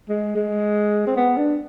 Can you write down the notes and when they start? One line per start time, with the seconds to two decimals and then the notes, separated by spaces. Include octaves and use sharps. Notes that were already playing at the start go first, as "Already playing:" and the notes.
0.09 G#3
0.36 G#3
1.07 C4
1.16 B3
1.37 D4